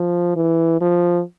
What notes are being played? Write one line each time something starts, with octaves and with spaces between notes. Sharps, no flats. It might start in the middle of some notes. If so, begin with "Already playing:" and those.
Already playing: F3
E3
F3